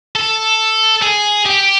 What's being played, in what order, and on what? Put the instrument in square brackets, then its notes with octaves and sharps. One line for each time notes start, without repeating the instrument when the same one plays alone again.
[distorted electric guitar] A4
G#4
G4